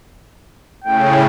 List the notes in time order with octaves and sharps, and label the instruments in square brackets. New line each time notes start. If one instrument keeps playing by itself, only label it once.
[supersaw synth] A2 C#3 [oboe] G5